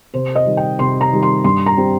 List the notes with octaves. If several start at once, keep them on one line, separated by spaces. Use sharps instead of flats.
C3 C5
D#5
D#3 G3
G5
C3 C6
A#5
D#3 G3
C6
G2 C6
A#5
G3 C4